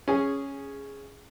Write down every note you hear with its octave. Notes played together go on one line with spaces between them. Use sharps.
C#4 G#4